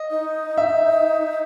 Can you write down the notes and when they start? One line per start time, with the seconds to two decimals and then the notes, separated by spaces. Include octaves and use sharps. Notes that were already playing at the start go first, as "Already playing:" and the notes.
Already playing: D#5
0.10 D#4
0.57 E5